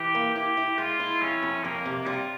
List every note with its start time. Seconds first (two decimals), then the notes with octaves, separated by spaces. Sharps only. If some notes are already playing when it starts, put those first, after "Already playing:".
Already playing: E3 G4
0.15 A#3
0.35 E4 G4
0.57 E4
0.78 G#3 F4
1.00 E4
1.21 F2 C#4
1.43 F2
1.64 F2 A#3
1.86 C3
2.06 G3 F4